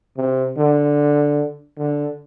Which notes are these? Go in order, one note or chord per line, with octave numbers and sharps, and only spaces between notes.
C3
D3
D3